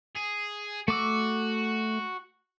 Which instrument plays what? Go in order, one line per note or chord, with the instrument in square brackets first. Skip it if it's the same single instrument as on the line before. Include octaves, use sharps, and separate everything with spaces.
[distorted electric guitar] G#4
[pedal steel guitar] A3 D6 E6 [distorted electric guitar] F#4